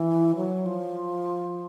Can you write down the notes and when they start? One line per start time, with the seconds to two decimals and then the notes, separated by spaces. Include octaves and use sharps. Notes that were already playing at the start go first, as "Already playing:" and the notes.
Already playing: E3
0.36 F#3
0.66 F3